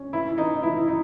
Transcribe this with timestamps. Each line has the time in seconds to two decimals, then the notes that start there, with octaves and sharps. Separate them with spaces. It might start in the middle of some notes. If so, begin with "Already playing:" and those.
Already playing: C#4
0.13 E3 E4
0.38 E3 D#4
0.63 E3 E4
0.88 D#4